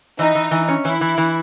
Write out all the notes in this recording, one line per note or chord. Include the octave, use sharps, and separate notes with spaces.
E3 D#4
E3
E3
C#4
E3 E4
E3
E3